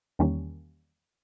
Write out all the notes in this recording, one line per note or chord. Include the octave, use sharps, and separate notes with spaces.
E2 D#3 G3 A#3 C#4